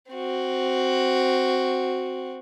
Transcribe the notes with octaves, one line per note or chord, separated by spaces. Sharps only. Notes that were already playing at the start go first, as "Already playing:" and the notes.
C4 F#4